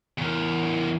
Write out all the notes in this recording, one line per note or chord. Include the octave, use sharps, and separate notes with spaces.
E2 A#4